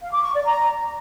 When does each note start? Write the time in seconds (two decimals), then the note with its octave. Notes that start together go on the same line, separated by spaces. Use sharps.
0.01 F5
0.12 D6
0.23 C#6
0.34 D5
0.45 A#5